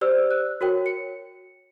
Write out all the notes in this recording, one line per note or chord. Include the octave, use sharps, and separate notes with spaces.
G4 C5 D5 E6
F#6
F#4 A#4 C#5 G5
C#7